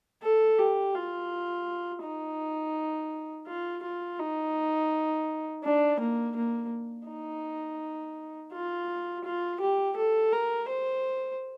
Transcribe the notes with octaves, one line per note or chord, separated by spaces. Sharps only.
A4
G4
F4
D#4
F4
F4
D#4
D4
A#3
A#3
D#4
F4
F4
G4
A4
A#4
C5